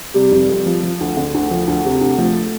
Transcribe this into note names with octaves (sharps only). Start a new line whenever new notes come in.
C3 G3
F1
F2
F3
F3
D2
D3
D2
F3
D2
C3
D2
F3 A3